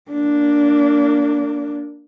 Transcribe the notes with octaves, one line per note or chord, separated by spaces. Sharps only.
A#3 D4